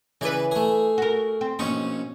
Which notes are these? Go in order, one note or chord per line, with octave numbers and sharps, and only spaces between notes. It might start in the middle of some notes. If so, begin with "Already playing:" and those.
C#3 E3 B4 D5
A3 G#4
F#4 A#4
C4
A#1 B2 C#4 D#4